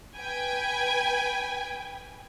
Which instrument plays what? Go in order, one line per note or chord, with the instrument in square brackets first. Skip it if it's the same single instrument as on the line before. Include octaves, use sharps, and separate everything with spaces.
[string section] B4 G5 G#5